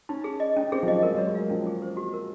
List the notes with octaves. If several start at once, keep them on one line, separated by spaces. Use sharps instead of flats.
C#4 D#4
G#4
D#5
C#4 D#4
C4 G#4
F3
F#3 D#5
G#3 A#4
F#3
C#5
G#3
A#3 F5
F3 C#4
G#4
C5
F#4
A#4